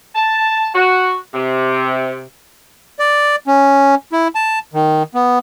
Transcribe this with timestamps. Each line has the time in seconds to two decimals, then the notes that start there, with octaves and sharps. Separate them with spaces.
0.15 A5
0.75 F#4
1.34 C3
2.99 D5
3.47 C#4
4.12 E4
4.35 A5
4.74 D#3
5.15 B3